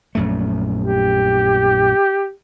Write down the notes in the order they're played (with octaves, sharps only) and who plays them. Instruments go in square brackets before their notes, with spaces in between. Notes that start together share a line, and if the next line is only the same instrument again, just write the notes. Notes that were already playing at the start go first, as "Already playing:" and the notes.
[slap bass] A#1 F#2 A3
[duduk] G4